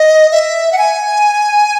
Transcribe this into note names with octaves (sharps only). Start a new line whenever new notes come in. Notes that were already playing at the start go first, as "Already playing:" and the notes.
Already playing: D#5
E5
F#5
G#5